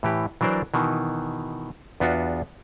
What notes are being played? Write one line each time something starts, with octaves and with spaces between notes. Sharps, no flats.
A2 E3 G4
E3 F#3 D4 A#4 C5 D5
B2 D#3 E3
E2 B3 D4 F4 F#4